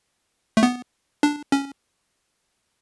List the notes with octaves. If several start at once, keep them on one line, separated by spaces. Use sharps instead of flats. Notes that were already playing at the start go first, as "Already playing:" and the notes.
A3
B3
D4
C#4